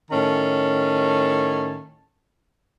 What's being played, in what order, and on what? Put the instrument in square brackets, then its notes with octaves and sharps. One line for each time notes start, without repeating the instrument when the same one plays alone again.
[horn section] A2 D#3 C#4 A5